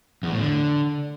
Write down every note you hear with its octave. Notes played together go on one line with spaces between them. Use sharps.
E2
A2
D3